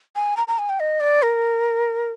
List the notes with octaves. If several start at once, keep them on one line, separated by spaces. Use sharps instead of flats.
G#5
A#5
A#5
G#5
G5
D#5
D5
A#4